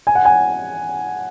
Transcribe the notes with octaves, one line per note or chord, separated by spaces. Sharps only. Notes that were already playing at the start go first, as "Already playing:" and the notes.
G#5
F#5
G#5